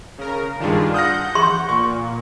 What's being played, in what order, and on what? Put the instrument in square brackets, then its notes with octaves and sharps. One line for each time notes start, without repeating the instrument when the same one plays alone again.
[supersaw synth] C#3 A#4
[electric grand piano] G2 D#3 [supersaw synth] D4 F4 G#4
[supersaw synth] F#5 G6 [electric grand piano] D#6 F6 A#6
[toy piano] C6
[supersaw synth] A#2 [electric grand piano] C#6